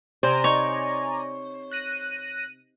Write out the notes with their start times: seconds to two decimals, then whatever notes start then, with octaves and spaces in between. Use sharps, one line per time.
0.23 C3 C5 D5 G#5 A#5
0.44 D#4 C#5
1.71 F#6 A#6 D#7